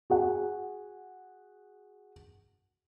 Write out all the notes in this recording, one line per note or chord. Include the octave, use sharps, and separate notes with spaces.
F#4 G#4 F#5